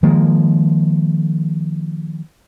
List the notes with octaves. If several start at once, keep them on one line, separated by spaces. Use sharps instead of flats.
D#3 F3 G#3 A#3